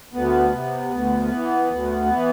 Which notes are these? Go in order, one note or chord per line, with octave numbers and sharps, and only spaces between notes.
D2 B3
C3
D2
E3
D2
E3